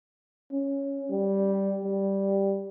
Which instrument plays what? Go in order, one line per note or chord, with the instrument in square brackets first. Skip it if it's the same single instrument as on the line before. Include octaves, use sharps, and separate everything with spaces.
[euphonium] C#4
G3
G3